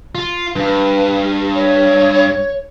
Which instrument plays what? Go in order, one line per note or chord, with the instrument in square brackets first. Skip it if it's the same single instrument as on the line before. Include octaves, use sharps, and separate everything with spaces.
[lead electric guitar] F4
[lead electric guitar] G2 [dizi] B4
[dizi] C#5